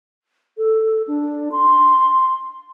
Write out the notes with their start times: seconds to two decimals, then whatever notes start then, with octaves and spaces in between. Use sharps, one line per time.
0.58 A4
1.08 D4
1.52 C6